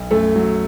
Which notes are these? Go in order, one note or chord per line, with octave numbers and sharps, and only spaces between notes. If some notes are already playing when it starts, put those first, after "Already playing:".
Already playing: B1
F#2 A3 A4
F#3